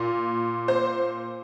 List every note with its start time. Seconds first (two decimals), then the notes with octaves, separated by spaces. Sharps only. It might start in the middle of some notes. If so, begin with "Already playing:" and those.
Already playing: A#2
0.68 C5